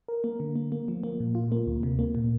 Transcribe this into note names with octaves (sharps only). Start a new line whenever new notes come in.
A#4
A#3
D3
A#3
A#3
F3
A#3
A#2
F4
A#3
D2
C3
A#3
A#2